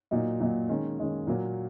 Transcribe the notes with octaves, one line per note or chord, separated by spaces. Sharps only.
A#2 F#3 D#4
A#2 F#3 D#4
D#3 G#3 C#4
D#3 G#3 C#4
A#2 F#3 A#3